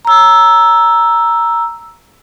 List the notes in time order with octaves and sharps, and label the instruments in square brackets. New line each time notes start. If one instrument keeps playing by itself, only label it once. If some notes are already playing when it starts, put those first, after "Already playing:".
[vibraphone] A#5 E6